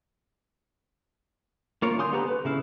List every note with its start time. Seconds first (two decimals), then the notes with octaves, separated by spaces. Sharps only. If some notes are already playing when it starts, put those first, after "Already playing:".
1.82 A#3 F4 A#4 C#5
1.99 D3 G#5 C6 D#6 G6
2.13 B3 G4 A4 B4 A#5
2.28 B4
2.45 C#3 E4 F5